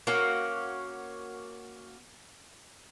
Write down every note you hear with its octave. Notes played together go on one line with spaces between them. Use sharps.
A#3 C#4 F#4